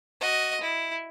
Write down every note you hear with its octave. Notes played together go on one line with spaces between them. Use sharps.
F#4 D#5
E4